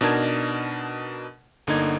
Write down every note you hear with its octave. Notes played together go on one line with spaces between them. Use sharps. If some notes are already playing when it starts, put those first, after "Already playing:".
B2 D4 D#4 A#4 A5 G#6
G1 D3 A#3 D#4 G#6